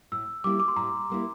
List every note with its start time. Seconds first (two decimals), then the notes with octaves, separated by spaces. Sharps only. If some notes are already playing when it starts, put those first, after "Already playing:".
0.12 A2 E6
0.44 G3 A#3 E4 D6
0.60 D6
0.68 C6
0.76 A2 A#5
1.10 G3 A#3 E4